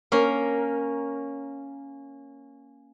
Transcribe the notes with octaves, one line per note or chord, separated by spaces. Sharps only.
A#3 C#4 A#4